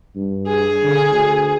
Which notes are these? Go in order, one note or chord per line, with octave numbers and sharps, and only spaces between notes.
G2
G#4
D3
D2